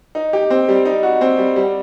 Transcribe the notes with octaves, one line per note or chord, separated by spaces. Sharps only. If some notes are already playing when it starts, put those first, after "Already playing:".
D#4
G4
C4
G3
D#4
F#4
C4
G3
G3